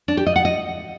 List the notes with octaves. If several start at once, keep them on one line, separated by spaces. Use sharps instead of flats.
D4
G4
D#5
F#5
D#5